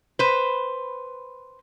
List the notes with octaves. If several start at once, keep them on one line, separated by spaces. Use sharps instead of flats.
B4 C5